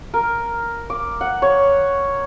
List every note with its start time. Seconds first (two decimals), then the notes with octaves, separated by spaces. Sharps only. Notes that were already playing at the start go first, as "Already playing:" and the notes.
0.14 A#4
0.90 D6
1.21 F#5
1.42 C#5